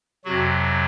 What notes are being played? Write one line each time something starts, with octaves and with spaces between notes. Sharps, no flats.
F2 C3 F#3 F#4